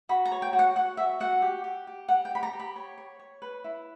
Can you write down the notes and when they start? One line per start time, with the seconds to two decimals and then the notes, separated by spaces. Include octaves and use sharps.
0.09 F#4 B5
0.25 A#5
0.32 C#5
0.42 G5
0.53 F#4
0.59 F#5
0.76 F#4 F#5
0.97 F#4 E5
1.20 F#4 F#5
1.42 G4
1.64 G4
1.87 G4
2.08 G4 F#5
2.25 G5
2.31 G4 B5
2.43 A#5
2.53 G4
2.59 B5
2.76 C#5
2.98 C#5
3.19 C#5
3.42 B4
3.64 E4